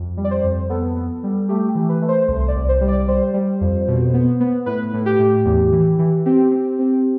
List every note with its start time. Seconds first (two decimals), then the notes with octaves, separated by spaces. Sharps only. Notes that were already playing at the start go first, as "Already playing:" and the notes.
Already playing: F2
0.17 G3
0.24 D5
0.31 C5
0.44 F2
0.70 B3 A4
0.96 B3
1.23 G3
1.49 A3 G4
1.69 G4
1.75 E3
1.89 B4
2.02 A3
2.08 C5
2.28 C2 C5
2.40 C5
2.48 D5
2.55 C2
2.69 C5
2.81 G3
2.88 D5
3.08 G3 C5
3.34 G3
3.61 F2
3.88 B2
4.14 B3
4.40 B3
4.66 A2 B4
4.94 A2
5.06 G4
5.19 A2
5.45 E2
5.72 E3
5.99 E3
6.26 C4 G4
6.51 C4
6.79 C4